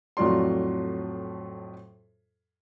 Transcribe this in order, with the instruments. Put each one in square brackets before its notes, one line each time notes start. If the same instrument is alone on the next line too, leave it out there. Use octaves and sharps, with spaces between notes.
[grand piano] F2 A2 F#3 F4 D5 C6